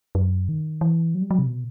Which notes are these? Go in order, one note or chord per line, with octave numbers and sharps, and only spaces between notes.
F#2
D#3
E3
F#3
G3
F#3
C3
B2